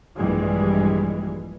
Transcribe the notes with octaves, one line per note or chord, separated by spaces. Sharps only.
A#1 G2 E3 G3 G#3